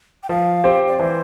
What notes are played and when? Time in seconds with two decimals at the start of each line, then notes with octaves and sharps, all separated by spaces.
0.23 G5
0.29 F3 F5
0.64 C4 G4 C5
0.87 D5
0.99 E3 C5